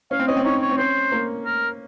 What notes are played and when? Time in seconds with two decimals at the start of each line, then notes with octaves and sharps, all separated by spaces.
0.11 C#4 F5
0.20 C4
0.27 C#4 D#5
0.37 C4
0.44 D#4 C#5
0.61 C#5
0.69 C4
0.78 C#4 C5
1.12 A#3
1.45 A#4